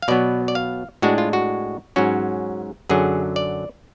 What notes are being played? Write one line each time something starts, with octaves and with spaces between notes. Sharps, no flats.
F5
B2 F#3 B3 D5
D5
F5
A2 G#3 D4 F#4
F4
F#4
G#2 F#3 C#4 F#4
F#2 D3 F#3 G#4
D5